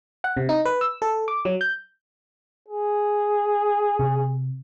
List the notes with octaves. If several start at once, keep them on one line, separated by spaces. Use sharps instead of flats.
F#5
C3
D#4
B4
E6
A4
D6
F#3
G6
G#4
C3